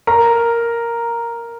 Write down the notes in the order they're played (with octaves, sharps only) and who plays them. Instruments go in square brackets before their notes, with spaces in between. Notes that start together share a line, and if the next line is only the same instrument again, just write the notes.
[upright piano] A#4 A#5